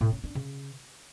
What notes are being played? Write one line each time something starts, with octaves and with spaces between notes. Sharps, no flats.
A2
C#4
D4
C#3